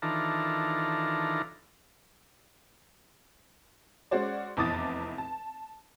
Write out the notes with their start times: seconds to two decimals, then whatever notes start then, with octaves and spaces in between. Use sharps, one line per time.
0.02 D#3 E3 D4 F4 A4 A#5
4.11 G#3 C#4 F#4 C5 D5
4.57 F1 E2 A5 D6 D#6 A6
5.18 A5